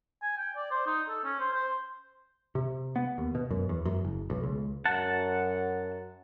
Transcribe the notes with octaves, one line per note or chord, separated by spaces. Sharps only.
G#5
G5
D5
C5
D#4
A4
C#4
C5
C5
C3
B3
D#2
B2
F#2
E2
F#2
F#1
B1
C#2
F#2 F#5 A5